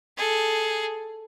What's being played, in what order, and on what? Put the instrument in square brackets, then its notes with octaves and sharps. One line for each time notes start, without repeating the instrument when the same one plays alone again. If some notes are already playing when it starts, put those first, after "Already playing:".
[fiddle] G#4 A4